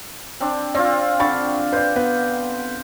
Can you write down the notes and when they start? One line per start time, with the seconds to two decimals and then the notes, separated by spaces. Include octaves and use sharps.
0.40 C4 D4
0.75 C4 F4 D5
1.20 D3 B5 C#6 A6
1.73 B4 C5 D5
1.96 B3 B4